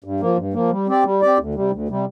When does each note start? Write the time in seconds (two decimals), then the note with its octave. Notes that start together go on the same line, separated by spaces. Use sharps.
0.04 G2
0.20 F3 A#3
0.37 G2
0.54 F3 A#3
0.71 G3
0.88 C4 G4 D5
1.05 G3
1.21 C4 G4 D5
1.38 D2
1.54 C3 G3
1.71 D2
1.89 C3 G3